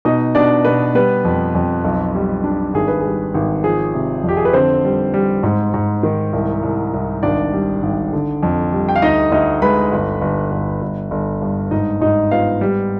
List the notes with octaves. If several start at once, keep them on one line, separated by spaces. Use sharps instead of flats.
B2 D#4 D#5
B2 D4 D5
B2 B3 B4
G3 B3 B4
F2
F2
B1
G3
D4
G#1 G#4
B4
G3 G#4
G#1
F3 G#4
C3
F2
G4
G#4
B4
D3 C4 C5
G3
G3
G#2
G#2
D#3
C2
C2
C2
G#1 D4 D5
G3
G#1
D3
F2
G3
G5
F5
D2 D#4 D#5
D2 D#4 D#5
G#3 B4 B5
G1
G1
G1
G1
G1
G2
G#2 D#4 D#5
G#2 D#4 D#5
B3 F4 F5
G3